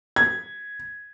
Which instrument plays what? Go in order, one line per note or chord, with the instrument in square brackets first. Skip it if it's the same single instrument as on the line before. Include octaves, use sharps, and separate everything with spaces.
[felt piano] G#6